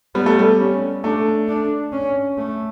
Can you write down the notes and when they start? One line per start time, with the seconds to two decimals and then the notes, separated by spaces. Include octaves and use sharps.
0.15 G3 B3
0.26 A3
0.39 G3
0.59 C#4
1.04 A3 D4
1.48 D4
1.92 C#4
2.37 A3